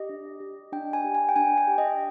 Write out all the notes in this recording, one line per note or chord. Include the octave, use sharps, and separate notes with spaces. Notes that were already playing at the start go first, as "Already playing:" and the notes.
Already playing: G4 D#5
D4
G4
D4 G5
G#5
G4
G#5
G5
D4 G#5
G5
G4
D#5